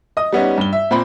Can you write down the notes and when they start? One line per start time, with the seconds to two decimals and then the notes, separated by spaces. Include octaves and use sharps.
0.17 D#5 D#6
0.33 G3 B3 C#4 D#4
0.58 G2 G7
0.73 E5
0.91 A#2 C4 B5